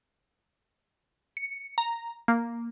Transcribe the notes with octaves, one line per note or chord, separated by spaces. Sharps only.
C#7
A#5
A#3